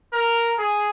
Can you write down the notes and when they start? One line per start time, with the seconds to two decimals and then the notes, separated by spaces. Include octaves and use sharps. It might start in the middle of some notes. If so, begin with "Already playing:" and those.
0.13 A#4
0.58 G#4